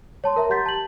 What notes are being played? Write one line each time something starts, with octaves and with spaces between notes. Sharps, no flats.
C#5 A5 C6
A#4 E5 A#5
G4 F#5 C6 G6 A6 B6
A5 F#7